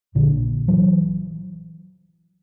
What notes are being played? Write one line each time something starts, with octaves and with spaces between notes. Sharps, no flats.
A#1 A#2 D3
E3 F#3